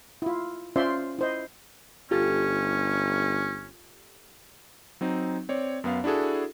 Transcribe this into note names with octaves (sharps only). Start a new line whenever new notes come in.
E4 F4
C#4 F4 C5 D5 E5 C6
E4 C5 D#5
G1 C#4 F4 G4 A4
F#3 C4 D#4
C4 C#5 D5
F#2 B3 F5
D4 E4 F#4 G#4 A4